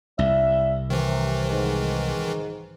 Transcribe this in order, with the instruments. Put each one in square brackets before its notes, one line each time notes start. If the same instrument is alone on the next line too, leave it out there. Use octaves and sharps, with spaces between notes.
[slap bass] C2 [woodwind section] G3 E5
[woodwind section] C3 [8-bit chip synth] D#3 E3
[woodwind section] G#2